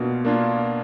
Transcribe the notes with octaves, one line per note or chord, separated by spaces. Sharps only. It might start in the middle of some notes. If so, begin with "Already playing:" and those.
Already playing: B2 A#3 D4 F4
A#3 D4 F4